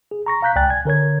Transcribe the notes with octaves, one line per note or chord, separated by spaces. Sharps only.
G#4
A#5 C#6 A#6
F5 A#5 F#6 G6 B6
C#2 D5 G5 G#5 F#6 A6
G#5 G#6
D3 A#4 C#5 G#6